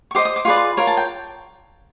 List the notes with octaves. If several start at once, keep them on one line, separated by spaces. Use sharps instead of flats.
C#6
G4 C5 D#5 D6
D#6
D6
F4 G#4 B4 D5 C#6
C6
F4 A#4 C#5
A5
G5